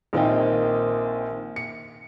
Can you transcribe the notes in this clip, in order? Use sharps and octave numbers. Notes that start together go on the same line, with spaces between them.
A#1 D#3 A#3 C4 D#5 G5
C#7